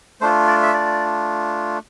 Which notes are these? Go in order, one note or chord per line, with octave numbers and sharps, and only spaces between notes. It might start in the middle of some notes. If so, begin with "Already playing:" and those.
A3 D4 F4 C5
D5
E5
D5